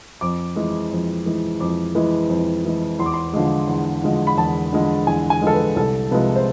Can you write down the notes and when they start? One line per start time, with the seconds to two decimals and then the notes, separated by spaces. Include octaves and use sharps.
0.21 F2 D6
0.56 E3 G#3
0.92 F2
1.26 E3 G#3
1.60 F2 D6
1.95 E3 G#3
2.29 F2
2.65 E3 G#3
2.99 E2 C6
3.06 D6
3.14 C6
3.33 D3 F3 G#3
3.68 E2
4.03 D3 F3 G#3
4.27 B5
4.37 E2 A5
4.73 D3 F3 G#3
5.07 E2 G#5
5.30 G#5
5.41 D3 F3 G#3
5.47 A4
5.53 B4
5.76 C2 A4
6.11 C3 F3 G#3 B4
6.35 C5